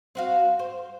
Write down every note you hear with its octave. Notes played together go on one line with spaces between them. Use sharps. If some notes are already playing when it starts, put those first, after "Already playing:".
C4 F#4 F5
C5